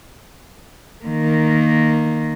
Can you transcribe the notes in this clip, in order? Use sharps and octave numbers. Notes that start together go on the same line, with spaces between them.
D#3 A#3